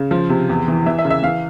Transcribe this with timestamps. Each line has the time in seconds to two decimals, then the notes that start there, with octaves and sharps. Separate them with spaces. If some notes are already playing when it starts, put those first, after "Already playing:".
Already playing: C#3
0.11 F3
0.30 C3
0.49 E2
0.68 E3
0.86 E3 E5
0.98 E5
1.05 C#3
1.11 E5
1.23 E3 F5